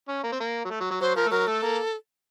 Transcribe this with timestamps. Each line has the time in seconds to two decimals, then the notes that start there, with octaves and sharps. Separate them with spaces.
0.09 C#4
0.24 A#3
0.32 C4
0.40 A#3
0.65 F#3
0.70 A3
0.80 F#3
0.91 F#3
1.01 F#3 C5
1.16 F3 A#4
1.26 A3
1.31 F#3 A#4
1.47 A3 A4
1.63 A#3